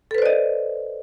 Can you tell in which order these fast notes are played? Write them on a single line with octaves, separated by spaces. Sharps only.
A4 B4 C5 D5 D#5